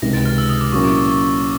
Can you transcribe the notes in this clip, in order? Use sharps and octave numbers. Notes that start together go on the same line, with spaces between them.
C#2 C3 D#3 A#6
A6
F6
E6
D#6
D6
A#2 F#3 A#3 C#4 E4 C#6
D6
C#6